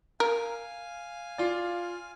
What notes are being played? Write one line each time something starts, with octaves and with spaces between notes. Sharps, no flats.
A#4 F5 G#5
F4 D5